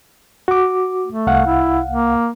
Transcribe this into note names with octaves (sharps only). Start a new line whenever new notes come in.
F#4 D6
A3
C2 F5 F#5
E4
A#3